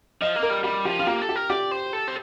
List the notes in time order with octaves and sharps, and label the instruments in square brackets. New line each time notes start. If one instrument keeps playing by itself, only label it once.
[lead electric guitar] F3 [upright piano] D#5
[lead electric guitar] A#3
[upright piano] A#4
[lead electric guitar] G3
[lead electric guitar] G3 [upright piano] G4
[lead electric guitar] F3 [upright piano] G4
[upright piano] F4
[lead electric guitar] A#3 [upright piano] G4
[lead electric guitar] A4
[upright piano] G4
[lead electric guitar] A#4
[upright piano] G4 [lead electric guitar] D5
[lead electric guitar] C5
A4
C5